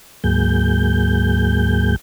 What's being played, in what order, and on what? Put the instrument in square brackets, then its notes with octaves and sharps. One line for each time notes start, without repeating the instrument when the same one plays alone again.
[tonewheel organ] D2 G#2 F#3 A#3 G#4 G6